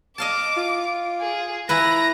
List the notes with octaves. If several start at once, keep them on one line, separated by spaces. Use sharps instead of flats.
D#5 F5 A5 D6
F4
G#4
E3 E4 B4 A#5 A#6